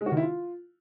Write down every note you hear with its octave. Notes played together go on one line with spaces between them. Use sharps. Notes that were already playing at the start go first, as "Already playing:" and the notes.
G#3
F#4
D#3
E4
F4